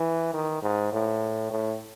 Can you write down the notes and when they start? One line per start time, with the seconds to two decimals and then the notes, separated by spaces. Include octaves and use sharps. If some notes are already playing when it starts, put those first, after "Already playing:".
Already playing: E3
0.34 D#3
0.63 G#2
0.93 A2
1.51 A2